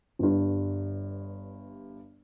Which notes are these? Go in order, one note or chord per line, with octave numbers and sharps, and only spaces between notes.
G1 G2